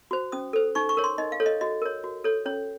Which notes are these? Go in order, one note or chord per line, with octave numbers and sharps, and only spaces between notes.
F#4 C5
C#4 D#6
A4 C5
D#4 C#6
C#6
A#4 C#5
C6
D#4 D#5
F5
A4 C#5
D#5
F#4 D#5
A#4 C#5
F#4
A4 C#5
C#4 C#5